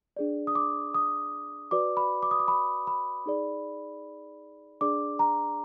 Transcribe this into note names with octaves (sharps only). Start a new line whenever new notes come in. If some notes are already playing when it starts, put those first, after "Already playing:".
D4 G#4 D5
D#6
D6
D#6
F#4 B4 D5 D6
B5
D6
D#6
D6
B5
B5
D#4 G#4 D5
D4 G#4 D5 D6
A#5